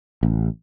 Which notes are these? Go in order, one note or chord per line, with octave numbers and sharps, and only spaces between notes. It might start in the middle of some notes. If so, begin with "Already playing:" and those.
A1